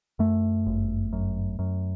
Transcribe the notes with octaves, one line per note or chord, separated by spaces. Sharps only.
F#2 A3
G1
F#2
F#2